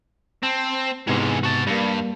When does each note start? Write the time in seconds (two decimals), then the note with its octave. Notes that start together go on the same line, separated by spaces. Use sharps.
0.43 C4 A5
1.07 G#2 C3 E3 G#3 B3
1.43 F#4 A5
1.67 G2 G3 A#3